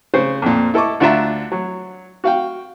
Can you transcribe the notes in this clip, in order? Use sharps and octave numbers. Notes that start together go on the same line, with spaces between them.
C#3 C5
F2 A#2
E4 A4 D#5 C#6 D6
D2 D4 F4 E5 A#5
F#3
F#4 F5 G5